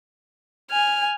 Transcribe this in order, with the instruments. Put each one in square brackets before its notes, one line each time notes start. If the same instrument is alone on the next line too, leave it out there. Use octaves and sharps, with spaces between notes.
[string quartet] G#5 [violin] F6